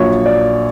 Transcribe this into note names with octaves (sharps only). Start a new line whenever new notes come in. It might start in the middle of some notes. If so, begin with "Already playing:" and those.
Already playing: A#1 A#2 F#3 C#5
D5